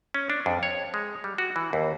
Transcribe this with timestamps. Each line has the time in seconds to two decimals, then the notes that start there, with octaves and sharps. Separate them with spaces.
0.14 C#4
0.30 D4
0.46 F2
0.63 C#5
0.94 G#3
1.24 G3
1.38 F#4
1.56 E3
1.73 D#2